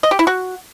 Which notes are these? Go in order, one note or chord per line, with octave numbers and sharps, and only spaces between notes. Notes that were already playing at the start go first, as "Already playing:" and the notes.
D#5
G4
E4
F#4